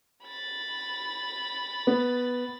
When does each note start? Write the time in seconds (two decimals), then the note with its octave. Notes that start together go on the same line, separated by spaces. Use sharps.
0.24 B5 A6
1.87 B3